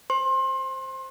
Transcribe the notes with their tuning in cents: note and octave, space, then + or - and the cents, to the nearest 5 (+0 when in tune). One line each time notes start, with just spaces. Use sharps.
C5 +0 C6 +30